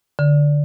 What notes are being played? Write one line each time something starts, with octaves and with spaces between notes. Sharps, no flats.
D3